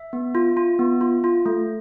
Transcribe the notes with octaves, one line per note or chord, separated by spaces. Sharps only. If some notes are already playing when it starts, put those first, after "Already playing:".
Already playing: E5
B3
F4
F4
B3
F4
F4
A3